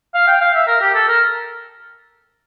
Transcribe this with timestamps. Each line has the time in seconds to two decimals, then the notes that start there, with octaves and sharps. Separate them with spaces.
0.14 F5
0.27 G5
0.41 F5
0.54 E5
0.67 A#4
0.81 G4
0.94 A4
1.08 A#4